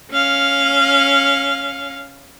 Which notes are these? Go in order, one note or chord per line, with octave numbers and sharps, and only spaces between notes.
C#4 F5